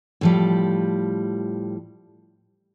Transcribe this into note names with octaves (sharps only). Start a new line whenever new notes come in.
A2 F3 G3